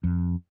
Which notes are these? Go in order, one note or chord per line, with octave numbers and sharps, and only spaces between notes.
F2